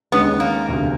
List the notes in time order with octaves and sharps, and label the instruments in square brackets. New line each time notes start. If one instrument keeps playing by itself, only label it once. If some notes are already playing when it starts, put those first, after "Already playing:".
[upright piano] D#2 D#3 G#3 C#4 [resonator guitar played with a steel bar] B3
[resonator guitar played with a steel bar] A#3
[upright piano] E1 D2 C3